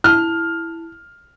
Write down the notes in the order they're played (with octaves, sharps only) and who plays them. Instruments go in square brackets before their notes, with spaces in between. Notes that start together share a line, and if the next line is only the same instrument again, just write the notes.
[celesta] E4 A5 [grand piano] F6